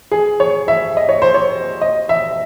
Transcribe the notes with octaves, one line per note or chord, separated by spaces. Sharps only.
G#4
C#5
E5
D#5
C#5
C5
C#5
D#5
E5